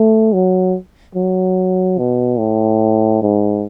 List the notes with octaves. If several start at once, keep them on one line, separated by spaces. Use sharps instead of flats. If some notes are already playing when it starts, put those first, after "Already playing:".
Already playing: A3
F#3
F#3
B2
A2
G#2